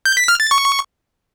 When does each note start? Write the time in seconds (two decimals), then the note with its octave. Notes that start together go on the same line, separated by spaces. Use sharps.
0.06 G6
0.17 B6
0.28 F6
0.40 A6
0.51 C#6